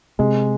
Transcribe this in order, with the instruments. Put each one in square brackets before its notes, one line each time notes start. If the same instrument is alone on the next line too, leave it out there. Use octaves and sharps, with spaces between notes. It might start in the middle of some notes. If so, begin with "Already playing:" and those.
[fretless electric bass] C3 [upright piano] G#3